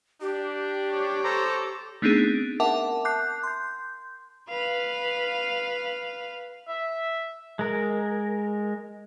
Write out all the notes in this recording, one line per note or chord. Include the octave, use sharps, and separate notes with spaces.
D4 G4
C#5 D6
A4 C5 A#5
A3 B3 C4 D4 D#4 G#4
A#4 E5 F#5 A5 D6
A5 D6 F#6 G6 C7
C6 G6
B4 F5
E5
G#3 A#4